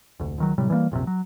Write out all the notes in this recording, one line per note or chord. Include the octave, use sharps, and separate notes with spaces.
F1 D2
C#2 D#3 F#3
A2 C3 F#3 G3
E3 G3 G#3 A#3
F1 A#1 F#2 C3
F#3